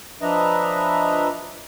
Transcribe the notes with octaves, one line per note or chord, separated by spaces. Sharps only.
F3 D4 B4 D#5 E5 A#5